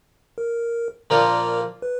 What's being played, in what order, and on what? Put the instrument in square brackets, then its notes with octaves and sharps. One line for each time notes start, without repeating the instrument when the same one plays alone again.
[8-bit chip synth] A#4
[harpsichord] A#2 F3 A#3 D4 F4 [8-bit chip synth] A#4
[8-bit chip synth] B4